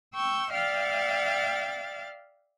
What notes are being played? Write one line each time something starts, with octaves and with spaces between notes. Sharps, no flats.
G5 C#6 E6 G6
D5 E5 F5 G5 F6 A6